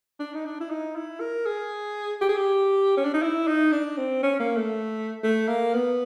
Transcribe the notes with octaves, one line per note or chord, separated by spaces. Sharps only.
D4
D#4
D4
E4
D#4
E4
A#4
G#4
G4
G#4
G4
C#4
D4
D#4
E4
D#4
D4
C4
C#4
A#3
A3
A3
A#3
B3